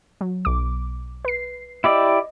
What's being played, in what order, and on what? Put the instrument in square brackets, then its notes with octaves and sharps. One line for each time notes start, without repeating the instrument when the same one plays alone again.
[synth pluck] F#3
B1 D6
B4 C7
[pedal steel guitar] E4 G4 D5 [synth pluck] D#5